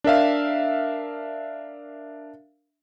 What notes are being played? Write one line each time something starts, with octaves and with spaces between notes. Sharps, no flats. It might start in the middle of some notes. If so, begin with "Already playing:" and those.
D4 A#4 E5 F5